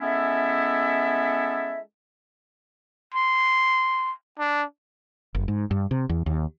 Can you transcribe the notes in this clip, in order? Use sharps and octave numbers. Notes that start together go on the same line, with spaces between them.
G#3 B3 C#4 E4 A4 E5
C6
D4
F#1
G#2
G2
C3
E2
D#2